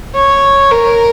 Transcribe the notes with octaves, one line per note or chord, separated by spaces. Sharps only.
C#5
A#4